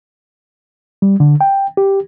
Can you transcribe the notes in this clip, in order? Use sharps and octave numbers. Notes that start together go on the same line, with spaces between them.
G3
D3
G5
G4